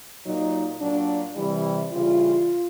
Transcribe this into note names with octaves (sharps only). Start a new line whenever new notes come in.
A#2 F#3 D#4
A#2 F#3 D4
C3 E3 G3 E4
C#3 E3 G3 F4